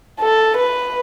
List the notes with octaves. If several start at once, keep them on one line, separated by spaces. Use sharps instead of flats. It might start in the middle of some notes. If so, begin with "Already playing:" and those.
A4
B4